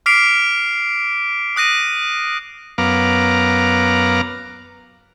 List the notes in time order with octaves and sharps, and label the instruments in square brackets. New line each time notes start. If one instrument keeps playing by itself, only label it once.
[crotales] D6 F6 B6 C7 D7 F7
D#6 F#6 A#6 D#7
[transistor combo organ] F#2 B3 F5 A#5 D6